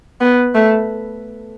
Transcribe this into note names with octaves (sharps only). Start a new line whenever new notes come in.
B3
A3